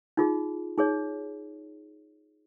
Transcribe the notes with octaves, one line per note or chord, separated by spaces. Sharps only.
D#4 F4 G#4
D#4 G#4 C#5